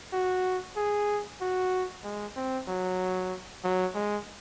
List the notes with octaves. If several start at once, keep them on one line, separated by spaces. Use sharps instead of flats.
F#4
G#4
F#4
G#3
C4
F#3
F#3
G#3